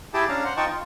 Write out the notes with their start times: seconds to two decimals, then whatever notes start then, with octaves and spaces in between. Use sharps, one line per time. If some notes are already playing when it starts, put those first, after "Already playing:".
0.14 E4 G4 G#4 G5 A5
0.28 C#4 D4 F5 A5 A#5
0.44 C5 F#5
0.57 D#4 F4 D#5 G5 A5 C#6
0.71 F4